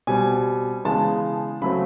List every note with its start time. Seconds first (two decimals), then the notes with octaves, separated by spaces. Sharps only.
0.07 B2 G3 C4 G#5
0.85 C#3 E3 G#3 B3 A5
1.62 C#3 F#3 A3 C4 B5